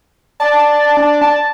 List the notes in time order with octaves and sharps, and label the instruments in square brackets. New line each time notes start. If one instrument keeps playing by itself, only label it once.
[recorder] D5 [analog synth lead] A5
[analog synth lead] D4
A5